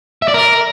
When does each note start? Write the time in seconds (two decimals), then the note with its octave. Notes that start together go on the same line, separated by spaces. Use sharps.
0.22 E5
0.28 D5
0.34 A#4